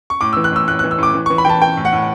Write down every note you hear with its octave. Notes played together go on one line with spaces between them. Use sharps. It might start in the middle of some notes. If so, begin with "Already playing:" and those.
C#6
A2 D6
E6
E3
F#6
A2 E6
A2 F#6
F#6
E3
E6
A2 D6
E3
C#6
E3
B5
E3 G5 A5
E3 G5
A2
F#5
A2